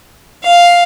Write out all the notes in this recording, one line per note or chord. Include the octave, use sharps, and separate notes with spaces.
F5